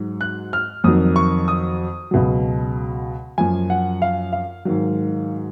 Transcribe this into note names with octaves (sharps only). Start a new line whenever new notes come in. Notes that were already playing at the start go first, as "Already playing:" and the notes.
Already playing: G#2 F#3
F#6
F6
F2 D#3 F#3 D#6
C#6
D#6
C#2 B2 F#3
F#2 F3 G#5
F#5
F5
F5
G#2 D#3 F#3